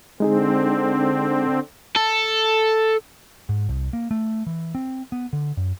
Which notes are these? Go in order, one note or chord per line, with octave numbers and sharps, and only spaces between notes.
D3 G#3 C4 D#4 G#4
A4
G#2
C2
A#3
A3
E3
C4
B3
D3
F#2